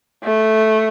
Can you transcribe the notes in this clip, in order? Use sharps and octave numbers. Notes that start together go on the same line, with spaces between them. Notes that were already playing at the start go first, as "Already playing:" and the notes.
A3